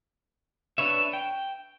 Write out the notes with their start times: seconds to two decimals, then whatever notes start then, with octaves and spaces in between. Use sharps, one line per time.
0.78 D4 B4 C#5 E5
1.13 G5